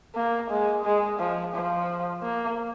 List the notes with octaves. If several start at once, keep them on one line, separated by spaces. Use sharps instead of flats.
A#3
G#3
G#3
F3
F3
A#3